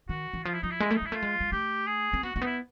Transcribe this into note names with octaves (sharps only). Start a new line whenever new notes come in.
D#3 F#4
E3
F3 F4
E4
F3 D#4
E4
G#3
A3
D#4
G#3 E4
A3 F4
G#3
G#3
A3 G4
G#4
C4
B3 F#4
A#3 F#4
B3 D#4 E4